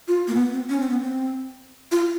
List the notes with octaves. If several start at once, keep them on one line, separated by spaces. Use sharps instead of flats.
F4
A#3
B3
C4
C#4
C4
B3
C4
F4